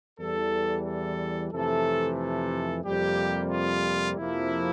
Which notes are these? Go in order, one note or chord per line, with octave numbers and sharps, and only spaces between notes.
E2 E3 G3 A4
A4
F2 C3 E3 A3 A4
A4
F2 C3 G3 A#3 G4
F4
F2 C3 F3 A#3 E4